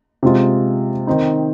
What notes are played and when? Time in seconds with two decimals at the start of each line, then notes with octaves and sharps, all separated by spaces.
0.23 C3 G#3 F4
1.07 D#3 C4 D#4